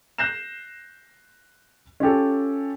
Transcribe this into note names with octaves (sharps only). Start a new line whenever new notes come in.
F#6 G6 A#6 C7 E7
C#4 F4 G4 A4